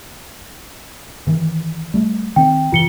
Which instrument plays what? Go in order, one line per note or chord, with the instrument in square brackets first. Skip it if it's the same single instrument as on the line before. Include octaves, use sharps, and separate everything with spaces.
[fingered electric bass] G2 D#3 E3
G3 A3
[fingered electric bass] D#3 C4 [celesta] G5
[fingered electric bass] F#2 C3 E3 [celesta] F4 C#7 G7